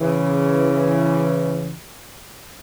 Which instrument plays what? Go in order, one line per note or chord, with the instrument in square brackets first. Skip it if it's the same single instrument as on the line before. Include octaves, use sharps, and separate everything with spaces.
[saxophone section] C#3 E3